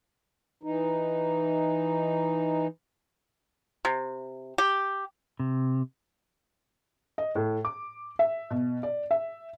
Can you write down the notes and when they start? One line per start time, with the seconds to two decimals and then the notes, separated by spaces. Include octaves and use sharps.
0.63 E3 D#4
3.85 C3
4.58 G4
5.40 C3
7.18 D#5
7.35 A2
7.65 D6
8.19 E5
8.51 B2
8.83 D5
9.11 E5